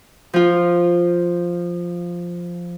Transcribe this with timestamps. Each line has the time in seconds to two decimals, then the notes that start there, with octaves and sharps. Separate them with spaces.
0.33 F3 F4